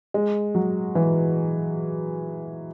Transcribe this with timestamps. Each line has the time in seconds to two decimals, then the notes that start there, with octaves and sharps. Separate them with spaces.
0.14 G#3
0.55 F#3
0.95 E3